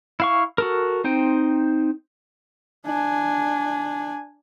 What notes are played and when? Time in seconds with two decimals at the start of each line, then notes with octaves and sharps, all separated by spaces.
0.20 E4 F5 C#6
0.58 F#4 A4 A#4
1.04 C4 D#4 C5 G5
2.86 D4 G#5